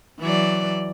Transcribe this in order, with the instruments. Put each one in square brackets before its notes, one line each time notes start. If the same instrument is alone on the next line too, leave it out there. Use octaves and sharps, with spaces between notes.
[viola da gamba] E3 F#3 D5